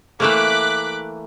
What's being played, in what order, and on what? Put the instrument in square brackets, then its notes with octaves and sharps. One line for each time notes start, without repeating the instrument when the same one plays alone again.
[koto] E3 A3 A#3 [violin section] D6 F#6 B6